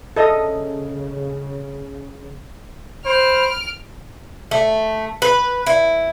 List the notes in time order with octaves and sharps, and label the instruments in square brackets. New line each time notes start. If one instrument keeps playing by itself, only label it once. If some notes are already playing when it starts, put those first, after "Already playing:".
[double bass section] C#3 [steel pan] A4 D#5 D#6
[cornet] C5 [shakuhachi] B5 [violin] F6 D7
[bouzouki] A3
B4
E4